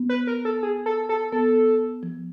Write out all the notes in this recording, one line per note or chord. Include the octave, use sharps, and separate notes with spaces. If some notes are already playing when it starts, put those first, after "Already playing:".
Already playing: B3
B4
A#4
A4
G#4
A4
A4
B3 A4
F3